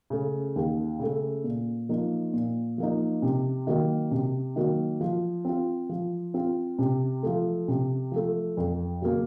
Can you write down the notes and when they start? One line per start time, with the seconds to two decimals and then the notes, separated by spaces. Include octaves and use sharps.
0.10 C#3 A3
0.56 D#2
0.99 C#3 A3
1.44 A#2
1.89 F3 A#3 D#4
2.33 A#2
2.78 F3 A#3 D#4
3.22 C3
3.67 D#3 F#3 A#3
4.11 C3
4.56 D#3 F#3 A#3
5.01 F3
5.45 C4 F4
5.89 F3
6.34 C4 F4
6.79 C3
7.23 F3 A3
7.68 C3
8.12 F3 A3
8.57 F2
9.01 C#3 F#3 A#3